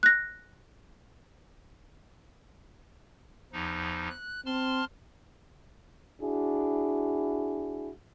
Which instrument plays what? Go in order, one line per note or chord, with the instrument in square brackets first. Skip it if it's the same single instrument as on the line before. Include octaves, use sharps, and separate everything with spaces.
[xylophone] F#6 A#6
[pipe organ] E2 F3 D#4
F#6
[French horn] C4 [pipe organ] A5 C6 F6
[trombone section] D4 E4 F#4 G#4